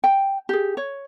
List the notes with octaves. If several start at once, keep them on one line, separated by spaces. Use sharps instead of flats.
G5
G4 G#4
C#5